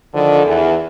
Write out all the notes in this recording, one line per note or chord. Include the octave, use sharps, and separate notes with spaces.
D3 D#3 F3
E2 E3